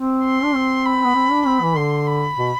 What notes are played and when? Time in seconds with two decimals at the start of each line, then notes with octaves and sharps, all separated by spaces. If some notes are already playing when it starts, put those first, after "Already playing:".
Already playing: C4
0.24 C6
0.43 D4
0.55 C4
0.85 B5
1.05 B3
1.15 C4
1.31 D4
1.45 C4 B5
1.62 E3
1.76 D3 C6
2.07 B5
2.38 B2